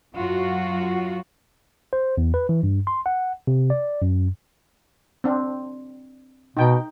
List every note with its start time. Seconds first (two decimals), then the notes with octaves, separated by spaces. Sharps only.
0.15 F#2 F#3 F4 F#4
1.93 C5
2.18 E2
2.34 B4
2.49 E3
2.63 G2
2.87 C6
3.06 F#5
3.47 C3
3.70 D5
4.02 F#2
5.24 C4 D4
6.57 B2 D#4 G5